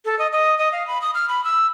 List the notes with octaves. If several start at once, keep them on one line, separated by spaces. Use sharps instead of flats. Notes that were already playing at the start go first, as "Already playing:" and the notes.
A4
D#5
D#5
D#5
F5
B5
D#6
F6
B5
E6